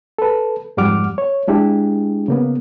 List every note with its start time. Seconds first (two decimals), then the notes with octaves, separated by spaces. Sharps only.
0.19 A4 B4
0.77 F2 G#2 G3 F#5 D6 F6
1.18 C#5
1.48 G#3 D4 E4 G4 G#4
2.28 C#3 A#3 B3